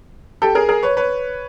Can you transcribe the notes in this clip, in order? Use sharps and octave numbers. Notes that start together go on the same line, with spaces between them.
G4 A4
G#4 A#4
G#4 A#4
B4 C#5
B4 C#5